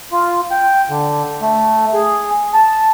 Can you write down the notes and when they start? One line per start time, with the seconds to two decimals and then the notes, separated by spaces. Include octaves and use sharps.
0.12 F4
0.51 G5
0.90 D3
1.42 A3
1.94 G#4
2.54 A5